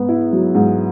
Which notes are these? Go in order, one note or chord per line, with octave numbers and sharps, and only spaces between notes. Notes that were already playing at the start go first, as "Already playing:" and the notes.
Already playing: G#2 B3
E4
F#3
G#2